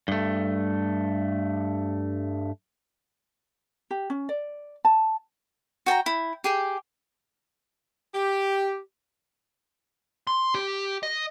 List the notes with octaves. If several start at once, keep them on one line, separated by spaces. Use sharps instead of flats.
G2 A3
G4
C#4
D5
A5
F#4 G5 A5 A#5
E4
G4 G#4 G5
G4
C6
G4
D#5